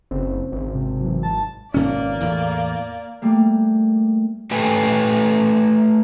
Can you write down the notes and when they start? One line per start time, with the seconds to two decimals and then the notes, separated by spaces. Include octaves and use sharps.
0.11 F#1 C#3 C4
0.52 G#1
0.74 C3
1.01 E3 F#3
1.23 A5
1.74 G#1 B2 A#3 C#4 D5
2.20 E2 A2
3.22 G3 A3 A#3
4.51 A3 G4 A4 B4 G5 G#5